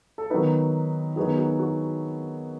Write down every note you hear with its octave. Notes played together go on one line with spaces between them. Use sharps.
A4
D#3 F#3 B3 D#4 B4
D#3 F#3 B3 D#4 G#4
F#4
F#4